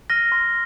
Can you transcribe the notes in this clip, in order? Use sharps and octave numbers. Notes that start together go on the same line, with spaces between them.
F6 A#6 D#7 G7
C6